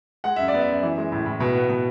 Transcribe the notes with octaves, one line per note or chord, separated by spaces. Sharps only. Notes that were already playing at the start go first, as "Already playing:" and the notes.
G#3 F#5
F#2 E5
D5
B3
E5
F#2
E3
G#3
A2
A2
B2
B3
B2